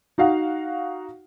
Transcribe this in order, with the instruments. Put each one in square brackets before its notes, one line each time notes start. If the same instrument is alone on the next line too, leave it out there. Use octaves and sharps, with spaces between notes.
[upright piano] D#4 F#4 F5 F#5